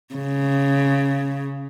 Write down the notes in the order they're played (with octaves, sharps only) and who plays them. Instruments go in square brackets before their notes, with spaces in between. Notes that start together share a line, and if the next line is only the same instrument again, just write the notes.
[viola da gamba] C#3